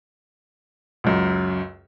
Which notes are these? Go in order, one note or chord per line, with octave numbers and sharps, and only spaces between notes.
C#2 F#2